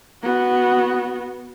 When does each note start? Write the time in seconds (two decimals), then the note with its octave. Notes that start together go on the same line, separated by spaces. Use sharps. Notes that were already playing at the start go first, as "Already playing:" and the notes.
0.23 B3 F#4